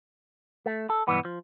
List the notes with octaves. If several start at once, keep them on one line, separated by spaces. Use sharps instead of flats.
A3
A4
B1 G2 E3 B3
F3